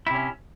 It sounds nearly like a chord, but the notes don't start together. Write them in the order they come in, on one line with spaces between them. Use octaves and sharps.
E4 C3 C#4